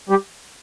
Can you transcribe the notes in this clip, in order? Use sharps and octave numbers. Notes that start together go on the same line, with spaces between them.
G3 G4